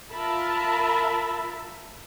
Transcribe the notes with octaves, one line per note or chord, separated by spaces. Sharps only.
F4 A#4 E5 A5 B5